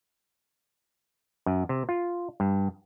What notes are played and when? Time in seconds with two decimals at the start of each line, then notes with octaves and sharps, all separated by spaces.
1.46 F#2
1.69 C3
1.89 F4
2.40 G2